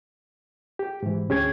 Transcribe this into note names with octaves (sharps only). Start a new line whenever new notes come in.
G4
G#2 E3
D2 C#4 G4 G#4 G#6